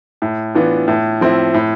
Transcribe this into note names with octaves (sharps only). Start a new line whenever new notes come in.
A2
E3 B3 D4 F4
A2
F3 C4 E4
A2